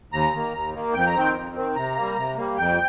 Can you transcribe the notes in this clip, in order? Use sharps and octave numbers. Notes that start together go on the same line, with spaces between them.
D#2 A#5
D#3 A#3
D#2
D#3 A#3
F2 G5
A#5
D#3 C4 G5
F2
D#3 C4
C3 A#5
G3 A#3
C3
G3 A#3
F2 G5